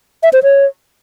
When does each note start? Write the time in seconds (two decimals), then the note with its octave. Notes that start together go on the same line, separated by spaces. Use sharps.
0.23 E5
0.33 C5
0.43 C#5